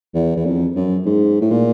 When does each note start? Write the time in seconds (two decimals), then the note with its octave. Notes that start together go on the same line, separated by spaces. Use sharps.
0.15 E2
0.36 E2
0.46 F2
0.76 F#2
1.06 G#2
1.41 A2
1.51 A#2